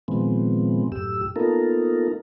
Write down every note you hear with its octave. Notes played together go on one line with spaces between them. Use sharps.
A#2 D#3 F3 G#3 B3 C4
F#2 A2 G4 E6
A#3 B3 D#4 F4 A4 A#4